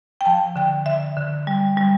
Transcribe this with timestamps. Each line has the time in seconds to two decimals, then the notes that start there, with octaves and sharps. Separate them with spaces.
0.21 G5
0.25 F3 A5
0.56 D3 G5
0.86 D3 E5
1.17 D3
1.47 G3
1.77 G3